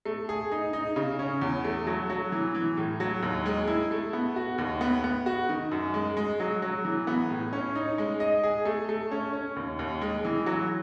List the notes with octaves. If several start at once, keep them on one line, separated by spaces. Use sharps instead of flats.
A3
G#4
D#4
D#4
C#3
C#4
E2
A3
F#3
F#3
E3
E3
A2
F#3
D#2
G#3
E4
A3
B3
F#4
D#2
B3
B3
F#4
D#3
F#2
G#3
G#3
F#3
F#3
E3
B3
A2
C#4
D#4
G#3
D#5
G#4
A3
A3
C#4
C#4
D#2
D#2
G#3
E3
F#3